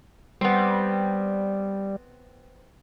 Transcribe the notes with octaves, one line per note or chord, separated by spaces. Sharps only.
G3 B3 C4